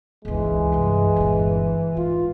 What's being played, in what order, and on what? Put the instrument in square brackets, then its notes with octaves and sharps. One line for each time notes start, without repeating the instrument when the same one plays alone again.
[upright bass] G1 C#2 [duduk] E3 [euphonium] G#3
[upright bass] C2 G2
G1 A#2
[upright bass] G#2 [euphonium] F4